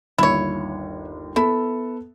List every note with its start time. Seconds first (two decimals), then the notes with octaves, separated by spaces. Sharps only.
0.18 G1 D#2 E4 C#5
1.36 B3 E4 A4